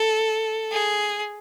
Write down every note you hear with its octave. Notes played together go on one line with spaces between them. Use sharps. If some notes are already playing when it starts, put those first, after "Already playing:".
Already playing: A4
G#4